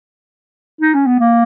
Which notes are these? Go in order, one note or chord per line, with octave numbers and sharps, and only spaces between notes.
D#4
C#4
B3
A#3